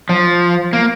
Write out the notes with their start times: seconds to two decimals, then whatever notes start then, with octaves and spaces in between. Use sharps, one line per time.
0.09 F3
0.73 A#3